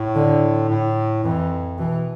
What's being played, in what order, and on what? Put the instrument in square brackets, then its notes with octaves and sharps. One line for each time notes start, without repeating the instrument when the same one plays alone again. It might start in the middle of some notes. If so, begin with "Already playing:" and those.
Already playing: [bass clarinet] A2
[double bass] D3
[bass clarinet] A2
[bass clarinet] F2 [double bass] E3
[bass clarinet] B2 [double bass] E3